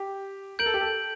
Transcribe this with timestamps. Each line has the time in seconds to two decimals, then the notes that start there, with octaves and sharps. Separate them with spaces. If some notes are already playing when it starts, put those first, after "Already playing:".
Already playing: G4
0.59 A#4 G6 D7 F#7
0.66 A4
0.74 G4
0.81 A4